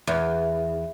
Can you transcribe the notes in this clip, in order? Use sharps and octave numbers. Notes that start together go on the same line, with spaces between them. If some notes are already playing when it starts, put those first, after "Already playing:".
E2